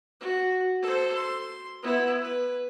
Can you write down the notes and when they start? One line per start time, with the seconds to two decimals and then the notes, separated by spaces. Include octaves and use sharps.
0.20 F#4
0.83 A4 C5
1.14 C6
1.83 B3 E4
2.21 B4